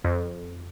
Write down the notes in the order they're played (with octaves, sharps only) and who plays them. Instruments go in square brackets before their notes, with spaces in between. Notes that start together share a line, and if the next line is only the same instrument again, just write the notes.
[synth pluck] F2